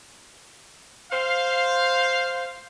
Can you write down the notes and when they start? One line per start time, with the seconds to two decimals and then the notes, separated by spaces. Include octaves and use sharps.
1.12 C5 F5